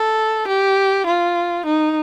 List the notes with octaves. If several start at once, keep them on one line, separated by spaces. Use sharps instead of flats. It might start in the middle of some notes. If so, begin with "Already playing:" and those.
Already playing: A4
G4
F4
D#4